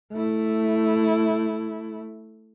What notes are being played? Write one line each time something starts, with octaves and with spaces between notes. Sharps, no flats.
A3 E4